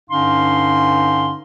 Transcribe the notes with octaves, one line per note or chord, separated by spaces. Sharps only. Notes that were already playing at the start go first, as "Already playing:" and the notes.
G2 D3 C#4 D#4 F5 C6